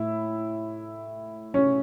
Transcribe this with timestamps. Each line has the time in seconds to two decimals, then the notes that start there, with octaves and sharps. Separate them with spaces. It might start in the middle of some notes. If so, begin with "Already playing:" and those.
Already playing: A2 E4
1.54 C#4